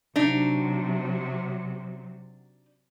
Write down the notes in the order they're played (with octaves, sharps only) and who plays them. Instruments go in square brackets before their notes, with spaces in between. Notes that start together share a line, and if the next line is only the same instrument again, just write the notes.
[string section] C3 F#3 [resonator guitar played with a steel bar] D4 D#4